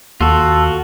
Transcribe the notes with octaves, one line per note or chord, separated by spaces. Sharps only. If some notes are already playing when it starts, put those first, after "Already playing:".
D#2 F4 F#4 A4